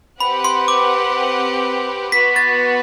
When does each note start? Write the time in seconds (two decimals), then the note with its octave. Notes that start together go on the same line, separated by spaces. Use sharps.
0.20 C4 G4 B4 F#5 B5
0.45 C6
0.68 D6
2.12 B3 F#4 B4 B6
2.36 A6